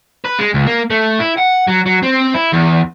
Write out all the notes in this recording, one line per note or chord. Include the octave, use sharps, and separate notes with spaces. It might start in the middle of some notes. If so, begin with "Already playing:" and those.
B4
G#3
C#2
A#3
A3
E4
F#5
F#3
F#3
C4
E4
E2